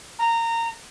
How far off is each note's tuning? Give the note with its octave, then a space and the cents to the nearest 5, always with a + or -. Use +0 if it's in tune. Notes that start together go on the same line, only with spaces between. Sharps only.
A#5 -20